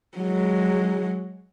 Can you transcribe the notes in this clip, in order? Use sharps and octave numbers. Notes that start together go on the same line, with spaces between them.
F#3 G#3